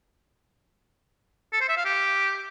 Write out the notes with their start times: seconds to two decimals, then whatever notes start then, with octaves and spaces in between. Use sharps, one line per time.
1.53 A4
1.61 C5
1.69 E5
1.77 F5
1.85 G4